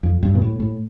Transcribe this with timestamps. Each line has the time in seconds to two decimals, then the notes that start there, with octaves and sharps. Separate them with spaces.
0.03 F2
0.23 G2
0.35 B2
0.42 A2
0.60 A2